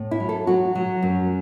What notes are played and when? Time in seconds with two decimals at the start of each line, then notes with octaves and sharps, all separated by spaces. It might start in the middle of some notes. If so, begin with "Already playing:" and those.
Already playing: A2
0.11 E4
0.20 F#3
0.29 A4
0.47 F#3 F#4
0.75 F#3
1.02 F#2